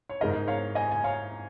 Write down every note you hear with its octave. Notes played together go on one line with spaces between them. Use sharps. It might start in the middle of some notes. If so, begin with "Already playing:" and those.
C#5
G#2 G#3 D#4 A#4 D#5
C#5 F5
D#5 G#5
G#5
C#5 F5